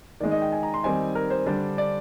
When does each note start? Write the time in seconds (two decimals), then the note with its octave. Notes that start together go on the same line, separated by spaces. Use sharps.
0.20 D#3 G#3 D#4 D5
0.32 D#5
0.42 G5
0.52 G#5
0.63 A#5
0.74 C6
0.84 D#3 G3 C4 D#4 G#5
1.15 A#4
1.30 C5
1.46 D3 G3 D4 C5
1.78 D5